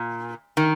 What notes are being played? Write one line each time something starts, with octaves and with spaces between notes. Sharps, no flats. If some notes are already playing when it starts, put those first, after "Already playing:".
Already playing: A#2
D#3